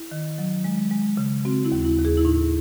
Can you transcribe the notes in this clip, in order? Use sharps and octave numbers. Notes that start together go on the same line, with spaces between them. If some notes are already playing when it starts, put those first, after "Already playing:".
Already playing: E4
D#3
F#3
G#3
G#3
C#3
C4 F#4
E4
D#2
E4
D#2
G#4
E4
A2 D#4